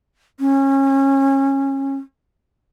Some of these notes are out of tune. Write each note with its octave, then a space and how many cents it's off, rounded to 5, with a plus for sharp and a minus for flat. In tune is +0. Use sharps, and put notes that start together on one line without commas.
C#4 -25